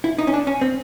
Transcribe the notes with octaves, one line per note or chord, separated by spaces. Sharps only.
E4
D#4
C#4
D4
C#4
C4